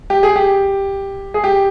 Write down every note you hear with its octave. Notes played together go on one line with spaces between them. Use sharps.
G4
G#4
G4
G#4
G4